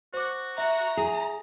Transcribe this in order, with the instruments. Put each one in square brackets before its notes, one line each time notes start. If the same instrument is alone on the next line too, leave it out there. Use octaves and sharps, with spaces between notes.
[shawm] F#4 [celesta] C5 D6
[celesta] E5 [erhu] A#5
[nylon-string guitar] G#4